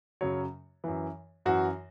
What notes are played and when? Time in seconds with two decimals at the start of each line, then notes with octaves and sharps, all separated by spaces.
0.21 F#2 C#3 F#3 C#5
0.84 F#2 E3
1.45 F#2 E3 F#4